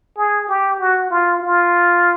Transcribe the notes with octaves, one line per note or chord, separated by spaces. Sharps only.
G#4
G4
F#4
F4
F4